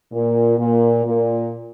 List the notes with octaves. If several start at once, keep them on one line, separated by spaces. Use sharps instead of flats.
A#2
A#2
A#2